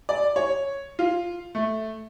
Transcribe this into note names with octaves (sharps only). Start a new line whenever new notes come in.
D5
C#5
F4
A3